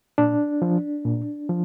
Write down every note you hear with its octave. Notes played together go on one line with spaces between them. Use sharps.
A#2 D4
F3
A#2
F3